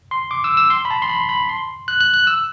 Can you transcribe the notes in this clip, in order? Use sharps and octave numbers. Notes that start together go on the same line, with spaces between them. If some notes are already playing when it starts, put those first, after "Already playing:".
C6
D6
E6
E6
C6
B5
A5
C6
B5
B5
C6
F#6
F#6
F#6
E6